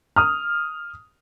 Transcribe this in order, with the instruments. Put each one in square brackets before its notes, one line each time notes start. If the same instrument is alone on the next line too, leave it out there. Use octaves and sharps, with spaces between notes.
[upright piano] D#6 F6